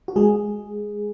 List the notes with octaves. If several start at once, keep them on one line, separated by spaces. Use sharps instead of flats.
F#4
G#3 G#4